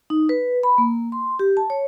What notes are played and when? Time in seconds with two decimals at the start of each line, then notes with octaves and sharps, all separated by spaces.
0.10 D#4
0.29 B4
0.63 B5
0.78 A#3
1.12 C6
1.39 G4
1.57 A5
1.70 C#5